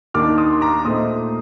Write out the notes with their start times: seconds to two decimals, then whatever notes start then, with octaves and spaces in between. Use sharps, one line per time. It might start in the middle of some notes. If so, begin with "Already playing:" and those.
0.14 D#2 D#3 A#3 D4 D6 F6
0.38 C6 D#6
0.53 C6
0.61 A#5 D6
0.85 A#2 A3 C4 D#4 C6 D#6